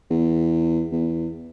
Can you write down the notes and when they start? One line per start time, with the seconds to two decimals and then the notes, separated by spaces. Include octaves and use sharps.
0.10 E2
0.92 E2